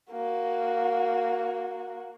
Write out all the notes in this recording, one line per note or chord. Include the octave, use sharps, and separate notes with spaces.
A#3 F#4